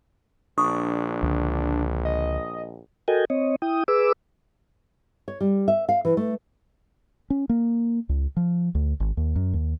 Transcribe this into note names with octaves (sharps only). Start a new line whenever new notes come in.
A#1 D4 C#6 D#6
C#2 D3
D#5
F#4 A4 A#4 D#5 G5 G#5
C4 C#5 D#5
E4 G5 D#6
G#4 B4 D6 E6
C#5
G3
E5
F5
E3
A3
C#4
A#3
C#2
F3
D2
G#1
D#2
F#2
D#2